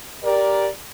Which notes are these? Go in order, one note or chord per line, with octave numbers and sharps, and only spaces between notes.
G4 A#4 D5